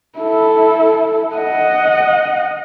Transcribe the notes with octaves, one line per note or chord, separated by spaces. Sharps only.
E4 A4
D#5 F#5